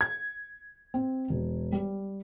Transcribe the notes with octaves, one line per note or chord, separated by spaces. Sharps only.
G#6
C4
E1
G3